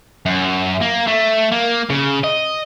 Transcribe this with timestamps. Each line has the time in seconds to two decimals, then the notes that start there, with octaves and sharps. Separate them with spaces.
0.26 F#2
0.81 A#3
1.07 A3
1.51 A#3
1.90 C#3
2.24 D#5